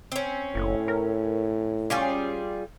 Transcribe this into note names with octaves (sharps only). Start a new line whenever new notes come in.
C4 C#4
F#1 A2
A#4
G3 C#4 F4 G#4